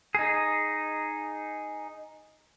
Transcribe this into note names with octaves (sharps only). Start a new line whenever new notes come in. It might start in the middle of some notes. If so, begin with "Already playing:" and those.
D#4 G#4